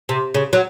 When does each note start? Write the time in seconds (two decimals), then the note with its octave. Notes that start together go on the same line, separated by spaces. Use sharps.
0.09 C3
0.34 C#3
0.53 F#3